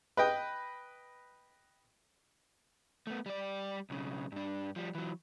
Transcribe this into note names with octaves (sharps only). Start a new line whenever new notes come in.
B4 D#5 G5
A3 B3
G3 D5
B1 C#3
G2 D4
F3 G3
E3 F#3